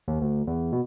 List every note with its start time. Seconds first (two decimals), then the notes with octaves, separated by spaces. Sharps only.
0.08 D#2
0.21 D2
0.47 E2
0.73 B2